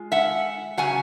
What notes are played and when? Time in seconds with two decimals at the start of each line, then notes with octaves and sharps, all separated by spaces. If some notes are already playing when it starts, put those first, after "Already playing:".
Already playing: G#3 F4
0.12 E5 F#5
0.77 C#3 F#3 F#5 G#5